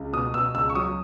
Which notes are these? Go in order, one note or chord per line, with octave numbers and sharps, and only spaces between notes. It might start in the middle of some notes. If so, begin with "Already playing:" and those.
Already playing: C#2
B2 D#6
B2 E6
C#2 E6
C#6
F#3 D#6